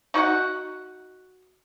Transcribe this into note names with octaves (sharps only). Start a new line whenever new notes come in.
D#4 F#4 D#5 F#5